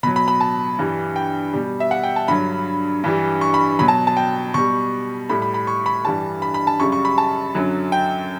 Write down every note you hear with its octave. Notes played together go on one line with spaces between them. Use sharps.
B2 F#3 B5
B5
B5
A5
G2 E3 G3
G5
B2 G3
E5
F#5
G5
A5
G2 D3 F#3 B5
G2 E3 G3
C#6
B5
B2 F#3 B5
A5
A5
G5
B2 G3 C#6
A2 G3 B5
B5
B5
C#6
B5
G2 E3 G3 A5
B5
B5
A5
F#2 C#3 G3 C#6
C#6
B5
A5
F#2 D3 F#3
G5